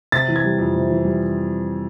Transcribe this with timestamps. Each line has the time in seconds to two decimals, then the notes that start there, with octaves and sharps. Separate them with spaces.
0.12 C3 A6
0.28 E3
0.36 G#6
0.44 G3
0.59 F2
0.75 C3
0.90 E3
1.05 G3